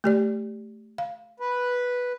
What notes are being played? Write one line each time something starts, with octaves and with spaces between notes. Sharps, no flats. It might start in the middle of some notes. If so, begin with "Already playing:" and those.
A3 G4 D5
F5
B4